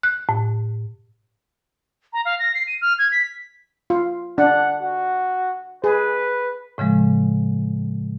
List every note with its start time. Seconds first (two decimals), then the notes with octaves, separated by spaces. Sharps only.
0.03 F#6
0.29 A2
2.13 A#5
2.25 F5
2.39 A#6
2.54 C7
2.67 D#7
2.81 F6
2.99 G#6
3.12 B6
3.90 F4
4.38 D4 F#5
4.80 F#4
5.84 G#4 B4
6.78 A2 C#3 F3 G#3